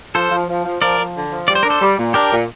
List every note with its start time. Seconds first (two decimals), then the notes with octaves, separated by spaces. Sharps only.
0.15 F3 A4 C5
0.31 F3
0.48 F3
0.65 F3
0.81 F3 A#4 D5
0.99 F3
1.16 D3
1.32 F3
1.48 G3 D5
1.55 C5
1.63 D4 A#4
1.70 A4 C5
1.81 G3
1.98 A#2
2.14 D4 G4 A#4
2.31 A#2